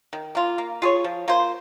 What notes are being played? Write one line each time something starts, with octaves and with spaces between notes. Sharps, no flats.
D#3
A#3 F4
A#3
F4 G#4 C#5
F3
A#3 F4 C5